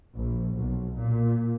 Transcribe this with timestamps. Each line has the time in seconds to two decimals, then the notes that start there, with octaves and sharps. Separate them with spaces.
0.15 A#1
0.54 B1
0.96 A#2